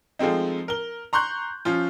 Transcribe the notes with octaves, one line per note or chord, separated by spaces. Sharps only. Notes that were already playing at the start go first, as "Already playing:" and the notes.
F3 G#3 A3 C4 D#4
A#4 G7
A#5 C6 C#6 F#6 G6
F3 C#4 F4